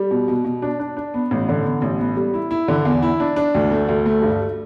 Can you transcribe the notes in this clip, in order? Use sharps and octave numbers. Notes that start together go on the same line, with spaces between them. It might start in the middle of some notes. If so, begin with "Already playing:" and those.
Already playing: G3
B2
B2
B2
D4
D4
D4
B3
A1
D3
B3
A1
B3
G3
E4
E4
D3
E2
E4
D4
D4
D2
A3
D2
A3
G2